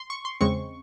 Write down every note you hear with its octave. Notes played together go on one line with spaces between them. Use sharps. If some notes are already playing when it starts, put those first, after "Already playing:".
Already playing: C6
C#6
C6
E2 C#3 G#3 C4 C#6